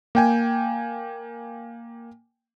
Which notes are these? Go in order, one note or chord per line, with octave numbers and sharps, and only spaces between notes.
A#3 G5 G#5